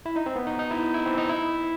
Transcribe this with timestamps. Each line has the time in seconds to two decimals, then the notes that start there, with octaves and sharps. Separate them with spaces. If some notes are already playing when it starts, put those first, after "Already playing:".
0.06 E4
0.16 D#4
0.26 C4
0.36 B3
0.47 D#4
0.59 D#4
0.71 E4
0.94 E4
1.06 C4
1.17 D#4
1.29 E4